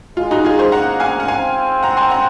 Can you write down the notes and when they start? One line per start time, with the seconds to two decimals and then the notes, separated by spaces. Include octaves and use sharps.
0.17 G#3 F4
0.31 D#4 F#4
0.45 F4 G#4
0.58 G#4 C5
0.72 A#3 F#5 A#5
1.00 F5 G#5
1.20 F#5
1.28 C4 F5 G#5
1.83 F#5 A#5
1.97 G#5 C6
2.10 F#5 A#5